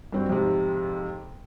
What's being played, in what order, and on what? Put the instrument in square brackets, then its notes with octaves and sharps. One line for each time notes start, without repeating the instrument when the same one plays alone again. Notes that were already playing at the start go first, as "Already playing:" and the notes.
[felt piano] G2 C4 F#4
F2 G#2 C3